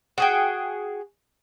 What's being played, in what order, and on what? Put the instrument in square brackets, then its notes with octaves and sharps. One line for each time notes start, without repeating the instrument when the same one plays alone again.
[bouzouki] F#4 G#4 G5